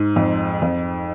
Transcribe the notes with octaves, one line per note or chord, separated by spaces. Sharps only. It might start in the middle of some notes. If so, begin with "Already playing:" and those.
Already playing: G#2
F2
F2